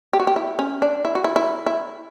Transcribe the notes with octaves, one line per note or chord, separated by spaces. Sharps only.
G4
F#4
G4
E4
C#4
D4
E4
F#4
E4
E4
E4